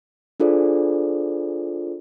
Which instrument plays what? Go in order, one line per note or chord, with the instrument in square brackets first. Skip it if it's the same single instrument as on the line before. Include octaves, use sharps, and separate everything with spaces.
[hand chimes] D4 F4 G#4 A4 C5 D5